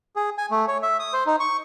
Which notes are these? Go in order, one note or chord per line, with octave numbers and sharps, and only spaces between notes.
G#4
G#5
A3
C#5
E5
D#6
C5
D#4
C#6